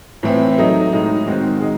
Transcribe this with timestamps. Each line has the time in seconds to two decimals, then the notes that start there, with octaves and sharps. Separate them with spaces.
0.23 A2 E3 C4
0.58 F#3 A3 D#4
0.92 A2 G#3 D#4
1.26 D#3 G#3 C4 F#4
1.61 G#3 D#4